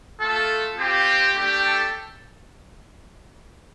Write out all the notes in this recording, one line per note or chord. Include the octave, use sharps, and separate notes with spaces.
A3 F4 A4
C4 F4 G4
A3 D4 G4
A4